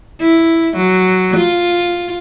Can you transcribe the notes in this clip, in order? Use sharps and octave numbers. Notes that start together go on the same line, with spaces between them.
E4
F#3
F4